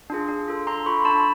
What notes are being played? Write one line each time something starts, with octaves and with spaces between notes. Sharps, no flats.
D4 F4 G#4
D4
F4 A4
D4 A#5 C6
F4 A4 B5 C#6
D4 A5 B5